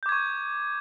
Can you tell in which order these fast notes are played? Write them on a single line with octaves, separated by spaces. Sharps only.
G6 D6 G#6 C#6